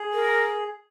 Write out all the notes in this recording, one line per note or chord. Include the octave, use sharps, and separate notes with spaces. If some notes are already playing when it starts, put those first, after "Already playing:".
Already playing: G#4
A#4